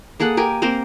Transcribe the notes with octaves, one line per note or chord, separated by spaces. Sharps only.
A#3 G#4 A4 F#5
G4 A#4 G#5
A#3 C4 A#4 C5